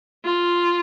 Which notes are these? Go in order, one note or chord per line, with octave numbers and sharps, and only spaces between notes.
F4